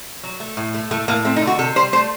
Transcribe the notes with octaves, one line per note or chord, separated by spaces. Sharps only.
F#3
A3
A2
A3
A2 A3
A2 A#3
A3 C4
D#4
D3
F#4
C3 A4
G3 C5
A3 C5